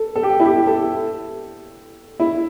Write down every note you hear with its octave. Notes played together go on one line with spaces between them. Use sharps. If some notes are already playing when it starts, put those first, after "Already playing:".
Already playing: A4
A4
G4
E4
G4
A4
E4